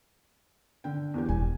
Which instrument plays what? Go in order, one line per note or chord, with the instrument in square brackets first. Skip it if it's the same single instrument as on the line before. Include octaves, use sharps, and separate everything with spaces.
[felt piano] D3 G5
E2 E3 G4
[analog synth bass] E1 [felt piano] G#5